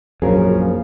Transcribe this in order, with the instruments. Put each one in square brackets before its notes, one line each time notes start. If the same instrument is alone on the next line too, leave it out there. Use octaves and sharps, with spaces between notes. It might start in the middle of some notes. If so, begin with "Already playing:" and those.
[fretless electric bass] A#1 F#2 [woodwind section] C#3 F3 [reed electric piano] G#4 A#4